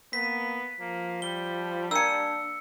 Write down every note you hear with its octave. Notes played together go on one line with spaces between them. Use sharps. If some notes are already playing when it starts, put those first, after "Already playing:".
A#3 B3 B6
F3 A#3
G3 G7
A#3 D4 G#5 E6 C#7